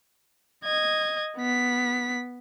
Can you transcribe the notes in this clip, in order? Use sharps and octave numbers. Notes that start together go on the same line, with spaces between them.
D#5 G#6
B3 B6